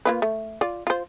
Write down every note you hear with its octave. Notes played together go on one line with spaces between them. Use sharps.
A#3 F4 B4
A3
F4 D5
F4 C5